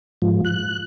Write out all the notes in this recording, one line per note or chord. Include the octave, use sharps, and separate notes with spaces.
G#2 F3
F#6